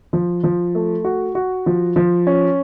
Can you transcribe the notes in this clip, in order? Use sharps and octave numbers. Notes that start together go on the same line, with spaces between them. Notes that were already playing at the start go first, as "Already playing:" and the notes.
F3
F3
A3
F#4
F#4
F3
F3
C#4